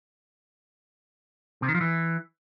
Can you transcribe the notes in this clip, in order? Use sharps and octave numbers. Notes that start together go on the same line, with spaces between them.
C3
D#3
F3
E3